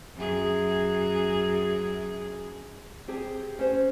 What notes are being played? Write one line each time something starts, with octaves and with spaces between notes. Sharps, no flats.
F#2 G#4
C4 G4 G#4 G#5
C#4 C5